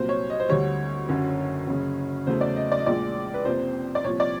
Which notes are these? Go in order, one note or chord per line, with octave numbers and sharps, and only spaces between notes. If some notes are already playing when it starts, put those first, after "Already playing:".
Already playing: C2 A#2 F#3 C5
C#5
D#5
C5
D2 D3 G3 C#5
F#1 F#2 D3
F#1 F#2 C#3
E2 C#3 F#3 A3 C5
D5
D#5
D5
D#5
A#1 A#2 F3 G#3 D5
B4
F2 C3 F3 A#3 C5
D5
C2 A#2 F3 C#5
D5